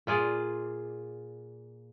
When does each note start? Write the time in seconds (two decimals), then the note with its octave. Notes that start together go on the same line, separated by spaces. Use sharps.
0.07 A#2 F4 G#4 D5